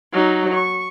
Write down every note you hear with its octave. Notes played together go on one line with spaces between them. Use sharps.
F#3 D#4
C#6